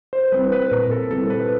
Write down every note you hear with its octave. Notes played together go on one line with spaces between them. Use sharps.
C5
G3 C4 E4 B4
B4
A#2 A#4
A4
G3 C4 E4 A4
B4